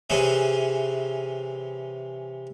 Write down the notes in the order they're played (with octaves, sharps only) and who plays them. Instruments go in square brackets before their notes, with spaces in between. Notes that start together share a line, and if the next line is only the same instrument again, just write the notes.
[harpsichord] C3 E3 C#4 G#4